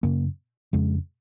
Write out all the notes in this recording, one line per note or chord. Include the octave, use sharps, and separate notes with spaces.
F#2 C#3 A#3
F2 C#3 G#3